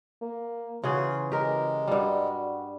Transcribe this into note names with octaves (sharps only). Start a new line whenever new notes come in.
A#3
C#3 E3 F4 F#4 G#4
G#3 G4 A#4
G2 G3 F#4